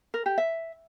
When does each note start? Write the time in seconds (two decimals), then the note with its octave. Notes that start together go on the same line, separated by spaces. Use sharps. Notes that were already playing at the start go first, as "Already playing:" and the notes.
0.14 A#4
0.26 G4
0.38 E5